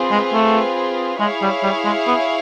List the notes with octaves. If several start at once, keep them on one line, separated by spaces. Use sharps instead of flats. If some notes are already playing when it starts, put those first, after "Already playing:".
Already playing: C4 F4 G#4 B4
G#3
A3
G#3 E4 G#4 C#5 F5
G3
G3
G#3
B3